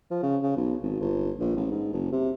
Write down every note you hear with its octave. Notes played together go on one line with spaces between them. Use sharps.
F3
C#3
C#3
B1
G#1
G1
A#1
A1
G#2
F#1
C3